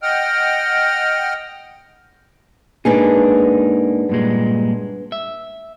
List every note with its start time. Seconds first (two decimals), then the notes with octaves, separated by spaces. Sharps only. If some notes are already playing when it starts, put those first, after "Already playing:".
0.03 D#5 F#5 G5 F6
2.85 G#2 A#3 B3 D4 D#4 G#4
4.09 G2 A#2 G#3
5.12 E5